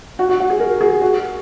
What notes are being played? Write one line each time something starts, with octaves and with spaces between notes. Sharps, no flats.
F#4
F#4
F#4
G#4
A#4
G#4
F#4